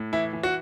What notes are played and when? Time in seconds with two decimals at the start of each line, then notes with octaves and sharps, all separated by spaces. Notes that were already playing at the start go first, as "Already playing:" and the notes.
Already playing: A2
0.13 E3 E4
0.33 E3
0.43 F#4